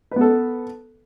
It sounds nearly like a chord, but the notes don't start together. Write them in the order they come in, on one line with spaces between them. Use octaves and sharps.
B4 B3 A4